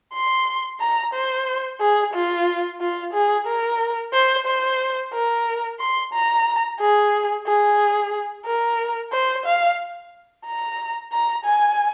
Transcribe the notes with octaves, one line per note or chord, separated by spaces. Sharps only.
C6
A#5
C5
G#4
F4
F4
G#4
A#4
C5
C5
A#4
C6
A#5
G#4
G#4
A#4
C5
F5
A#5
A#5
G#5